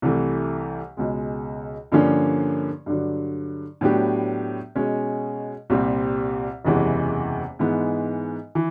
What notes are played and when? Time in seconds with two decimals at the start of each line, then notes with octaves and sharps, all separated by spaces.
0.02 C2 C3 E3 A3
0.97 C#2 B2 G#3
1.92 G2 D3 F3 A#3 C#4
2.86 G2 D3 F#3
3.81 A2 F#3 B3 D4 G4
4.75 B2 G#3 C#4
5.70 C2 A#2 G3 C4
6.65 F#1 E2 C3 E3 G#3
7.59 G#2 E3 G#3 B3
8.55 E3